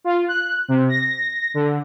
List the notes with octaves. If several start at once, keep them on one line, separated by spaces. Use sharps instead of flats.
F4
F#6
C3
A#6
D3